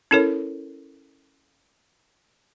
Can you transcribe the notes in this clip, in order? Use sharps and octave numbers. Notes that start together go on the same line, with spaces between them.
C#4 E4 A4 A#4 C#5